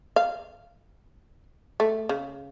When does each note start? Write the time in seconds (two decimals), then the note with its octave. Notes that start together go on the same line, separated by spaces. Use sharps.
0.16 F5
1.80 A3
2.09 C#3